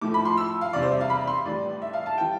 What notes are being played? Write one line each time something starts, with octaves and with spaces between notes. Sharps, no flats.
A2 F3 A3 D6
B5
C6
E6
F5
E2 C3 G3 D5
C5
E5
F5
B5
C6
A2 E3 G3 D5
E5
F5
A5
E3 G3 G5